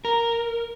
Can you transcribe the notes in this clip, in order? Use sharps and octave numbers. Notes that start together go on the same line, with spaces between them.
A#4